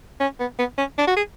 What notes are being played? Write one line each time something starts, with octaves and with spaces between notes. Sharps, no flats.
C#4
B3
B3
C#4
D4
F#4
G#4